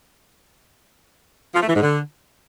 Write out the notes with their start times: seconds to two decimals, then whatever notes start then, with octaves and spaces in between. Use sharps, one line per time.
1.54 F3
1.61 A3
1.68 E3
1.75 G#2
1.82 D3